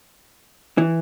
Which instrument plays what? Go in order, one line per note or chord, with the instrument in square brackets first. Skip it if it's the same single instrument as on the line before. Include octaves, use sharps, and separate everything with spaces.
[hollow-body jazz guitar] E3